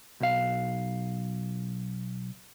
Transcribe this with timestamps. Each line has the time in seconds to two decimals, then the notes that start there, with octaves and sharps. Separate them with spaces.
0.20 B1 F5